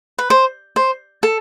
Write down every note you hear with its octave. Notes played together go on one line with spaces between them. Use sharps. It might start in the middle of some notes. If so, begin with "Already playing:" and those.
B4
C5
C5
A4